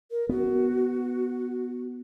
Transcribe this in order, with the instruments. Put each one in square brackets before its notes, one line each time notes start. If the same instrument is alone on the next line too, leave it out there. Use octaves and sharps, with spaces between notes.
[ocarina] A#4
[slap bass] B3 [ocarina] F#4